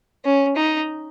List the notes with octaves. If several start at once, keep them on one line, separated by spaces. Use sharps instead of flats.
C#4
D#4